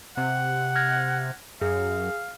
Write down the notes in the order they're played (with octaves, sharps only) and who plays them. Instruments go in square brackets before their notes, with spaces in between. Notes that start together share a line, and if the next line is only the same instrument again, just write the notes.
[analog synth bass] C3 [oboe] F#5
[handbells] F6 G#6 A#6
[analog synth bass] F#2 [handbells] G#4 [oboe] F5